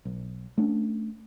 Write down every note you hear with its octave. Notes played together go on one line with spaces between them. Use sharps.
B1
A3 C#4 D4